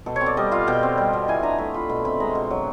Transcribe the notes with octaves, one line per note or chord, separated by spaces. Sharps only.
B2 A4
C#5
C4
D5
G3 D#5
F4 F5
B2 G5
C4
G3
B2
E3 G#5
D4 A#5
A3 B5
F4 B5
B2 B5
C4 B5
G#3 A#5
B2
F#3